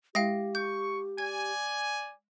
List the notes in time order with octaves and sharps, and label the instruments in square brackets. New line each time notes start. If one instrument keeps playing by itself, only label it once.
[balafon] G#3 E4 [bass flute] G4 [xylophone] F5 G5 A#6
[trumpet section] C#6 [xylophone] G6
[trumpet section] D5 G#5 [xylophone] G#6